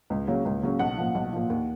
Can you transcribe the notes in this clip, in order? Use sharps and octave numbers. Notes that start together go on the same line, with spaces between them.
C#2
C#3 F#3 A#3 C#4
C#2
C#3 F#3 A#3 C#4
B1 F#5
A#2 F3
B1
A#2 F3
D#2